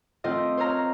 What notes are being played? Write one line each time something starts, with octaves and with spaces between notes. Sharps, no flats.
A3 C4 F4 D#5
C5 C#5 F5 A#5 F6